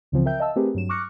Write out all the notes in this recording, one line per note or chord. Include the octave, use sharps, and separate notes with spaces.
C#2 C#3 E3 F3 C4
A#4 E5 G5 G6
D#5 F5 A5 E6
A3 C4 G4 G#4 A#4 B4
G2 F#3 E7
C#6 D6 F6 F#6 A#6 C#7